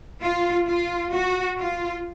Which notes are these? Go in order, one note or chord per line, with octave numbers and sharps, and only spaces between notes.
F4
F4
F#4
F4